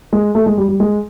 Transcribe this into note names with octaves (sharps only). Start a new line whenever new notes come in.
G#3
A3
G#3
G3
G3
G#3